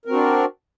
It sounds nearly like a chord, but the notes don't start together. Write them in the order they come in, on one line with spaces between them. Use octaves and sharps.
A#4 C4 F#4 D4